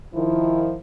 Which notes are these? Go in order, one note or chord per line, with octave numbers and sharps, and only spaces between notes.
D#3 F3 E4